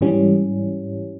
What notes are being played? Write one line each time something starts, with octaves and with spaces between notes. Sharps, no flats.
G#2 E3 G3 C#4